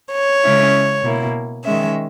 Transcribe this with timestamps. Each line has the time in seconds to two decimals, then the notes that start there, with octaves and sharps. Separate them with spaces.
0.12 C#5
0.43 C#3 G#3 C#4 E4
1.04 B2 A#3 E4
1.65 D#3 G#3 C#4 E5